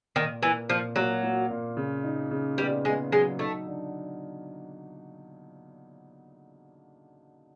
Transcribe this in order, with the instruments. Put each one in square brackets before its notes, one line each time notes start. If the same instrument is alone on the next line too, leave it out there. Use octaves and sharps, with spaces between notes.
[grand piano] A#2 [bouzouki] D#3
[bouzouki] E3 [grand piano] A#3
[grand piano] A#2 [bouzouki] F3
[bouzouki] F#3 [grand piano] A#3
[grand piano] A#3
A#2
C#3
D#4
C#3
[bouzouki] G3 [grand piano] B3
[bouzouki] G#3 [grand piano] B3
[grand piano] F#3 [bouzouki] G#3
[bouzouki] A3 [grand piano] D#4
[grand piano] D3